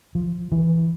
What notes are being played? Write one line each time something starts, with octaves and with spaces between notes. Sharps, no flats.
F3
E3